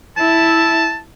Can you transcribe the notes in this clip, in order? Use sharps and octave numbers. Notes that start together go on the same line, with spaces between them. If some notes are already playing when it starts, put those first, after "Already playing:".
E4 E5 A5